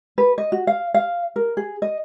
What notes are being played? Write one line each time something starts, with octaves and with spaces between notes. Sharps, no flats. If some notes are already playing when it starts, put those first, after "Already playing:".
B4
D#5
F#4
F5
F5
A#4
G#4
D#5